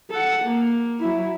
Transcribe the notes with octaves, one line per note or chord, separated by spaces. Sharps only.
A4 F#5
A#3
F#3 E4